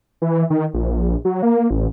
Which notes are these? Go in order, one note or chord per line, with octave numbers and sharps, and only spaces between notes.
E3
D#3
A#1
F#3
A#3
A1